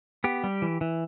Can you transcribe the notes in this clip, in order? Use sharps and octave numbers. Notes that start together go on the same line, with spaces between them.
B3 G4
G3
E3
E3